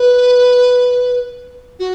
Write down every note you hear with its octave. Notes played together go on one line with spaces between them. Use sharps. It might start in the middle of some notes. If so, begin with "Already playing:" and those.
Already playing: B4
F#4